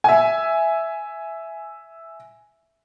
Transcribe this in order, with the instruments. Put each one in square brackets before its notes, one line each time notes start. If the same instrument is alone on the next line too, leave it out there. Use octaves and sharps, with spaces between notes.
[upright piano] E5 G#5